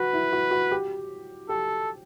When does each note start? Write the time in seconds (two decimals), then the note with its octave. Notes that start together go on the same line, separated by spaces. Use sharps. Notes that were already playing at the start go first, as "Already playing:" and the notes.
Already playing: F#4 B4
0.13 E4
0.33 F#4
0.51 F#4
0.72 G4
1.49 G4 A4